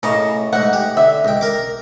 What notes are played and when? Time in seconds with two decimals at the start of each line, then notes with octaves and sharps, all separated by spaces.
0.03 A2 C#3 A#3 D#5 A5
0.53 G#2 A3 F#5
0.73 G4
0.97 D3 E5
1.25 C#2 G5
1.41 A#4 D6